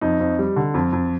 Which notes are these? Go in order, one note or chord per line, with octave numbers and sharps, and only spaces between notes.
F2 D#4
F2
G3
D3
F2
F2